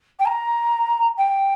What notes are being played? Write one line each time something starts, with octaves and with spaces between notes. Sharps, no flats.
G5
A#5
G5